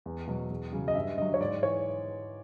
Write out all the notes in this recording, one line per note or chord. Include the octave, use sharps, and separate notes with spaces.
E2
B2 F#3
E2
C#3 F#3
D#5
G2 E5
D3 F#3 D#5
C#5
G#2 D5
E3 C#5